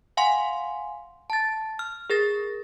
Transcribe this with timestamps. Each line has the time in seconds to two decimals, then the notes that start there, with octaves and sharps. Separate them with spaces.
0.17 F5 F#5 G#5 C6
1.30 A5 A6
1.79 F6
2.10 G#4 A#4 A6 A#6